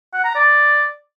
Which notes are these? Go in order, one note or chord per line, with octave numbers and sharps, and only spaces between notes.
F#5
A#5
D5